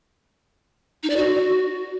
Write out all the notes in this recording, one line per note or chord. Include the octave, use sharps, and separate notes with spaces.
D#4
D5
F#4